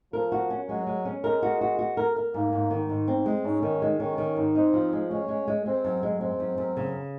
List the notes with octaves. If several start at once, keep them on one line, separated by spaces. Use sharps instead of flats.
F3 A#4
F#4
C#4
F#3 G#3
G#3
C#4
G#3 A#4
F#4
F#4
F#4
A#4
A#4
G#2 A#3
G#2
D#3
G#2
C4
G#3
G#2 C#4
D#3
G#3
D#3 C#4
D#3
G#2
C4 D#4
F3
G#3
G#3 C#4
G#3
G#3
G#3 C4
F#2
G#3
G#3 C4
F#2
F#2
C#3